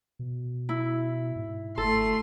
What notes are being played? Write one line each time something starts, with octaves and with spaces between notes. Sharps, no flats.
B2
E4
G#2
G1 A3 A4 C6